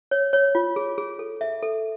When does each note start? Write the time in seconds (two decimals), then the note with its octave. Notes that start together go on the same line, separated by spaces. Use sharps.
0.11 C#5
0.33 C#5
0.55 F4
0.76 G#4
0.98 G#4
1.19 A4
1.41 E5
1.63 A4